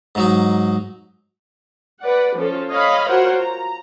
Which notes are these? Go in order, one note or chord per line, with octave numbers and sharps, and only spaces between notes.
G#2 F#3 D#4
B4 D5 F#5
F3 C#4 F4 A4
C#5 D#5 F5 B5
F4 F#4 A#4 C5 C#5 F#5
A#5